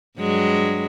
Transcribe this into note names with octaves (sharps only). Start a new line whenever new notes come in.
G2 F#3 G#3